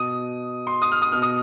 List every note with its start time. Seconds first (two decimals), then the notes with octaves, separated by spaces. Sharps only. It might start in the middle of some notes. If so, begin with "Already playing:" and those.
Already playing: B2 D#6
0.67 C6
0.82 D#6
0.92 F6
1.02 D#6
1.12 B2 F6
1.22 D#6